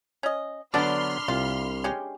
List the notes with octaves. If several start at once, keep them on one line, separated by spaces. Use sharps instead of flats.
C#4 D#5
D3 F#3 B3 D4 D5 B5 C6 F6
C2 F4
G#3 C#4 G4